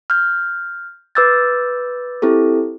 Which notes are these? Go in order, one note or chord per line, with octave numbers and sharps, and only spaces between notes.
F6 G6
B4 D6 E6 G6 A6
C4 E4 G4 A4